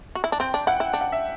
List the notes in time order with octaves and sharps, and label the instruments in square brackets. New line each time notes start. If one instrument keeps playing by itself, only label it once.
[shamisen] F#4
E4
D4
[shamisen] C4 [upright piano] G5
[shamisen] D4
[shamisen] E4 [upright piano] F#5
[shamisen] E4
D4
[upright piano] F#5
E5